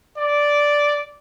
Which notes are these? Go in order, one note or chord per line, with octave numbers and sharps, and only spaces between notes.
D5